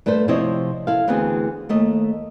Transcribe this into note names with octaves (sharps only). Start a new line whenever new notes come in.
G2 A3 A4 B4 C5
C3 F3 E4 C5 C#5 D#5
E4 A4 F5
D2 E3 B3 C4 G#4
D#2 A3 D#5